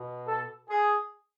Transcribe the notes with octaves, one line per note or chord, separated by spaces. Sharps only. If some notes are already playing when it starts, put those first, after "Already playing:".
Already playing: B2
A4
G#4